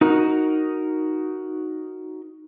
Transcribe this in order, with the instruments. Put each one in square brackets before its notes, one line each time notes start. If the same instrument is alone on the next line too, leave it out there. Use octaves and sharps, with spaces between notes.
[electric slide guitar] D#4 F#4 A#4